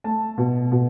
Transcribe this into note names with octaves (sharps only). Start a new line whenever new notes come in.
A3 A5
B2
B2